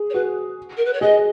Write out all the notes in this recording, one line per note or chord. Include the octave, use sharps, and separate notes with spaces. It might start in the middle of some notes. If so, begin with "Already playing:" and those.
Already playing: G#4
C#5
F#4 B4
A#4
B4
C#5
G#4 D#5